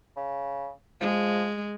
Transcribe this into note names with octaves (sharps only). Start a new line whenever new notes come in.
C#3
F3 G#3